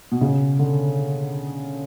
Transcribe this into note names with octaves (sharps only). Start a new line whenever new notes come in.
B2
C#3
D3